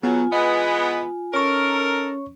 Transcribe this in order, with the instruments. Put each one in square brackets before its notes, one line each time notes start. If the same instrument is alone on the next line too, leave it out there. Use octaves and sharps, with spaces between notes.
[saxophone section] C#3 F#3 [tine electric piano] B3 [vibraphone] F4 G#5
[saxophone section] E3 G#3 B3 [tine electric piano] D#5
[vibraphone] C#4 [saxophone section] D#4 A4 A#4 [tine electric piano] C#5 C#6